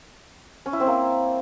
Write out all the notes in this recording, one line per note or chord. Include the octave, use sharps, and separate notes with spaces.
C#4
E4
C4
A#3